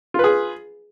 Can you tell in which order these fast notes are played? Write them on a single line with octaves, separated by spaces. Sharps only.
F4 B4 G#4